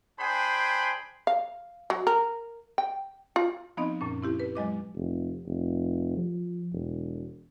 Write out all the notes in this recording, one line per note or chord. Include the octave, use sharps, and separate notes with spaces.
D4 G#4 C5 G5 G#5 B5
F5
F#3
A#4
G5
F4
F3 B3 C4 D#4 D#5
F#2 A#2 C#4
C4 E4 G4
B4
F#3 G#3 D#5 D6
F1
F1
F3
E1